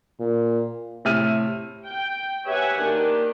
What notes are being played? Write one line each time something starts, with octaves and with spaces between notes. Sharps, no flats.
A#2
A2 C3 E5 F6 D#7
G5
G4 B4 C#5 E5 F#5 G#5
D#3 A#3 D4 G4